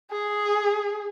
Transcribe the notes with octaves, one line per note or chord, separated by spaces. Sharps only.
G#4